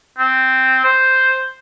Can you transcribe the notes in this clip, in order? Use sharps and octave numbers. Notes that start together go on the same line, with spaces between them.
C4
C5